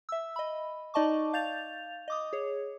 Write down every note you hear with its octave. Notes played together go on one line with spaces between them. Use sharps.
E5 E6
D#5 B5
D#4 D5 D#5 A5 C#6 D6
F5 G6 A6 F7
D#5 D6 D#6
G#4 C#5